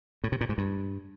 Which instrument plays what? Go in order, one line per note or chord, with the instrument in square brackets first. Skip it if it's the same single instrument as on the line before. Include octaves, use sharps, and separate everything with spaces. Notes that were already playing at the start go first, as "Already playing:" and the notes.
[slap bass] A2
C3
A#2
G#2
G2